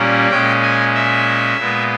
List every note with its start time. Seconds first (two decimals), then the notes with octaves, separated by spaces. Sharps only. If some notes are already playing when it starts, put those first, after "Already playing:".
Already playing: A#2 G3 A#3 C#4
0.30 A#2 G#3 C#4 G5
0.63 G#5
0.94 E5
1.57 A#2 G#3 B3